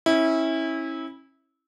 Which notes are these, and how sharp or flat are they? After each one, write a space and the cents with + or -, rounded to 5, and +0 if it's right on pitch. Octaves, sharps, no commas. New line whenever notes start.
C#4 -30 E4 -20